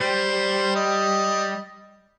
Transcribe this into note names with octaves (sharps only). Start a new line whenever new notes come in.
G3 C5
D#5